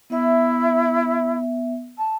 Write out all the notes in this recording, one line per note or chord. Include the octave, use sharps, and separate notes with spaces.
B3 E4 E5
A5